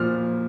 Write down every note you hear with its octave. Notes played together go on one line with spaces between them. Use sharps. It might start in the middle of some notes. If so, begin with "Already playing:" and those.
Already playing: A#2 F3 F6